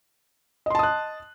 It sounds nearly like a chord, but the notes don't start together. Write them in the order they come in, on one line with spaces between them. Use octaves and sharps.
D#5 C6 A5 D#6 F#6